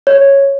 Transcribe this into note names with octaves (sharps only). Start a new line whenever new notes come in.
C#5